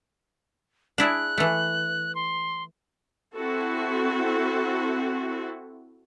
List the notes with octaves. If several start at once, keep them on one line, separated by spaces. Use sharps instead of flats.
D4 E4 G#4 F#6
E3 A3
C6
C4 E4 F#4 A4